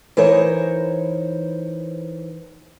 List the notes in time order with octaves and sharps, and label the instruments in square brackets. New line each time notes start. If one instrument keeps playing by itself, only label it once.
[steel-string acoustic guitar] E3 D#4 A#4 C5 C#5